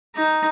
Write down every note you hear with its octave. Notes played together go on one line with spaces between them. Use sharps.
D#4